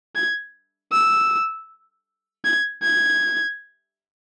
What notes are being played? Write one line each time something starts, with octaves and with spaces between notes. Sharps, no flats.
G#6
E6
G#6
G#6